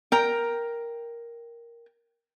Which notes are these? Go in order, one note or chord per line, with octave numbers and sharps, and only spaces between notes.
A#4 G5